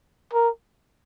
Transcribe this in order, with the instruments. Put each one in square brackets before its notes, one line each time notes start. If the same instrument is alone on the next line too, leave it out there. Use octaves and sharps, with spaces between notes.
[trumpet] A#4